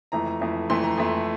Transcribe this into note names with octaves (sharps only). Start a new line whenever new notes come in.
F2 E3 A3 A#5
F2 E3 A3
F2 E3 A3 C6
A#5
F2 E3 A3